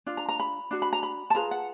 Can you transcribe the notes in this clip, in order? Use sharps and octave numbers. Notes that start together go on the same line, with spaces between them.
D4 F4
A#5
A#5
B5
D4 F#4
B5
A#5
B5
A5
F4 G#4 B4 A#5
F#5